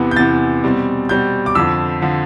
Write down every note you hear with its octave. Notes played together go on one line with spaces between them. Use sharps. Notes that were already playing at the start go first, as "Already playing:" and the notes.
Already playing: E2 C3 E3 B3
G6
E2 C3 E3 B3 A6
B2 G3 C4
B2 G3 C4 G6
D6
F2 D3 F3 E6
D3 F3